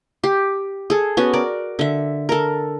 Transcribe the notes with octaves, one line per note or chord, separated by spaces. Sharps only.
G4
G#4 A4
B3 C#4 F#4
A#4 D5
D3 E5
A4 A#4